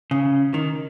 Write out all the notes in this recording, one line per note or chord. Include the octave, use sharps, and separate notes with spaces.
C#3
D#3